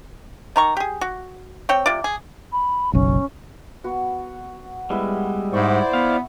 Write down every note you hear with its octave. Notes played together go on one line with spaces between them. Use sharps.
D#3 A#5 C#6
G4 G#4
F#4
C4 C#5 G5
C3 F4 D5
G#4
B5
F#1 B1 C#4
B3 F#4
G3 G#3 B3 E4 B4
G#2 E4 C5 D5 F#5 C6 C#6
B3 F5